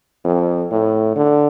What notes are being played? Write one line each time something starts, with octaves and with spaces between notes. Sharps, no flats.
F2
A2
D3